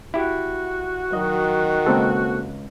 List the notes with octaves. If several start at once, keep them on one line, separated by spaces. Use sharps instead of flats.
E4 F#4 G4
D#3 F#3 D#5
C#2 A#3 C4 A4